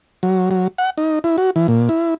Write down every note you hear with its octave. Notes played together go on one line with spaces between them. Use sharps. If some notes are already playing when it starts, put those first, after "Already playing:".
F#3
F#3
F#5
D#4
E4
F#4
E3
A#2
E4